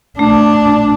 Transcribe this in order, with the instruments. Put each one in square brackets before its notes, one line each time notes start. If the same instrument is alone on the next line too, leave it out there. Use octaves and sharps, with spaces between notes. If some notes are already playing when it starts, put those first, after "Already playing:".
[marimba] A3 [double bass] D4